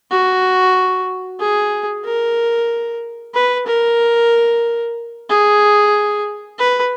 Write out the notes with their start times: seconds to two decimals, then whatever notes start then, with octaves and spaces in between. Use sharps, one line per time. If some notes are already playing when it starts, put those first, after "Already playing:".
0.11 F#4
1.40 G#4
2.05 A#4
3.34 B4
3.66 A#4
5.30 G#4
6.59 B4